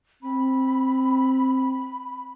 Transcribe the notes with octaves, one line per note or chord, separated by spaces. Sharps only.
C4 B5